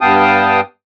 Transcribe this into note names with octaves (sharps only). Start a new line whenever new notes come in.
G2 B3 F5 G5 A5 D#6